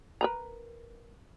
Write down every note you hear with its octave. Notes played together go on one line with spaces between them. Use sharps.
A#4 B4 A#5